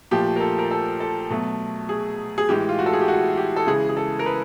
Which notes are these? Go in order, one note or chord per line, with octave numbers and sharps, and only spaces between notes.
A#2 F3 A3 G4
A#4
A4
A#4
A4
A4
B2 F#3 A3
G#4
G#4
A2 E3 G#3 G4
F4
F#4
A4
G#4
G4
F#4
G4
A4
C#3 E3 G#3 G#4
G#4
A4
A#4
B4